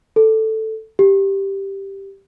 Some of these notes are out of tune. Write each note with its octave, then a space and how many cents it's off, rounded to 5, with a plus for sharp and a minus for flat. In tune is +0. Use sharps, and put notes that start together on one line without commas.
A4 +0
G4 +0